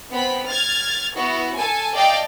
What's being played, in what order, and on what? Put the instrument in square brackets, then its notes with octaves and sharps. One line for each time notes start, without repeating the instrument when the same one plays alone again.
[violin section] B3 C4 B5
F6 G#6 A6
B3 E4 F#4
A4 G#5 A5
D5 D#5 F5 G5 A5 D6